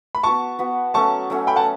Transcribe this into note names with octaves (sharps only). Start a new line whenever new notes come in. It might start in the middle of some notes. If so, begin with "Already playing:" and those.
B5
B3 F#4 B4 A5 C#6
B3 F#4 B4
F#3 A3 C#4 A5 C#6
F#3 A3 C#4
G5 B5
F#5 A5